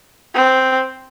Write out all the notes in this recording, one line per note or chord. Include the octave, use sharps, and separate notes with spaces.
C4